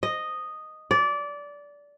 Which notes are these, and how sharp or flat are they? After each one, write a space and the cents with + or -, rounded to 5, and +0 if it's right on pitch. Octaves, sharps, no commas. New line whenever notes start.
D#5 -5
D5 -20